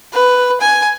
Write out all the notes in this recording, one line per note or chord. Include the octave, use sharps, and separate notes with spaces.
B4
G#5